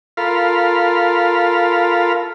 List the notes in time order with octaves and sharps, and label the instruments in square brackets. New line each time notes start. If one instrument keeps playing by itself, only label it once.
[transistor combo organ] F4 A4 A#4 F5 B5 C6